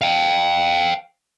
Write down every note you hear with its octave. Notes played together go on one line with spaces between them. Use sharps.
F5 G5